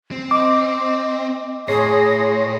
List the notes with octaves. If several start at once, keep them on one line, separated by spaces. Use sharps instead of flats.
C4
D#5 D6
A2 G#4 C#5 C6 A#6